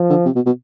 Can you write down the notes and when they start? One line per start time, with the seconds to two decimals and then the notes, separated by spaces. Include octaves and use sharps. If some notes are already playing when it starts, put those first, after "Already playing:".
Already playing: F3
0.10 D3
0.25 C3
0.36 B2
0.46 B2